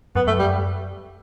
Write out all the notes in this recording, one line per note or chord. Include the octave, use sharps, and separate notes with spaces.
F#2 B3
F#2 A3
G3